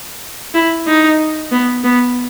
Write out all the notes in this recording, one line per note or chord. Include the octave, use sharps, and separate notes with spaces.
E4
D#4
B3
B3